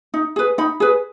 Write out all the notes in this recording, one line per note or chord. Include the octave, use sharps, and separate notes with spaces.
D#4
G#4 B4
D#4 B5
G#4 B4